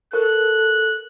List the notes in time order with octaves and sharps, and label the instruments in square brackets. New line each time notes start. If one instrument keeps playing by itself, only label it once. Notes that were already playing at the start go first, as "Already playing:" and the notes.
[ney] A4 [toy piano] A#4 C5 C#6 [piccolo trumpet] F#6